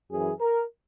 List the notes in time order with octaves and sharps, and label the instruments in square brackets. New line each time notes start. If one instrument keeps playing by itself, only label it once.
[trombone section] F#2 E3 G#4
A#4